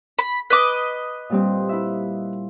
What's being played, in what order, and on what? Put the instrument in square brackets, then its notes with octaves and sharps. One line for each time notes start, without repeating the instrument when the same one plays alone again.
[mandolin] B5
B4 D#5 D6
[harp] A#2 G3 C4
E4 E5